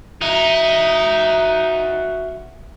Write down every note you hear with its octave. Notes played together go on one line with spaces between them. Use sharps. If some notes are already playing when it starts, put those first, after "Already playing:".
D#4 F#4 E5